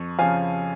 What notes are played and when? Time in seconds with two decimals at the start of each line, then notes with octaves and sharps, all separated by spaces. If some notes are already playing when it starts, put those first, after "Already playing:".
Already playing: F2 C#6
0.19 C#3 F3 F5 G#5